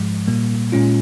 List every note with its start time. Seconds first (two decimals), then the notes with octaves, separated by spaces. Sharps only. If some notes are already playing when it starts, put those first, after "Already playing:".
Already playing: G#2 F3 G#3
0.28 A#2 G3 A#3
0.72 A#2 G#3 C#4 F4